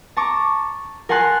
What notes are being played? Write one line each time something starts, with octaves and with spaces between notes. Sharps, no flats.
A5 A#5 C#6 D6
A#4 F#5 G#5 A5 C6 F#6